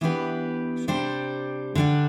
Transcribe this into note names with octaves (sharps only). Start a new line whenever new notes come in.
E3 B3 D4 G4 B4
C3 G3 D4 G4 C5
D3 G3 D4